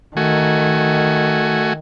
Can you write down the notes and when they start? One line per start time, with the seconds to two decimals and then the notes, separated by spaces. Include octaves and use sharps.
0.17 D#3 A3 F#4 G#5